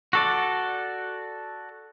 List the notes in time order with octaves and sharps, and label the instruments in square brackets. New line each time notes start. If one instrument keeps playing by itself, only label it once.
[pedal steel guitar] F#4 A4 D5